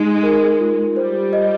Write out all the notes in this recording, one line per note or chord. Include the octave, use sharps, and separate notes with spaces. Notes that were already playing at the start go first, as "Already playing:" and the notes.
Already playing: G#3 D#4
A#4
F4
G3 C5
D#5